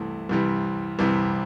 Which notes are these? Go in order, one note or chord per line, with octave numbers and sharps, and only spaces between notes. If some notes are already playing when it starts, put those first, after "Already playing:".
Already playing: C2 C3 E3 A3
C2 C3 E3 G3
C2 C3 E3 G3